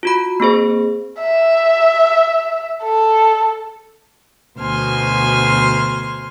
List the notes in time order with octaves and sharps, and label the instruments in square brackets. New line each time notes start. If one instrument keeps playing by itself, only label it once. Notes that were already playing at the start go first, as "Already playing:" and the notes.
[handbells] F4 F#4 B5
A#3 C4 G#4 C5
[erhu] E5
A4
[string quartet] D2 B2 C5 G#5 C6 F6